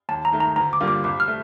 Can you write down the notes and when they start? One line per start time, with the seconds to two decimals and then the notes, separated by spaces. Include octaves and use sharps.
0.09 D#2 A5
0.25 A#5
0.32 D#3 A3
0.40 A#5
0.56 D2 A#5
0.73 D6
0.80 D3 G3 A#3 F4
0.88 D6
1.04 C2 D6
1.20 F6
1.28 A3